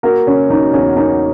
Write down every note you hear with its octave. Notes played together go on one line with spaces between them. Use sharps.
A#3 F#4 A#4
C#3 C#4
F#3 D#4
E2 C#4
A#3 D#4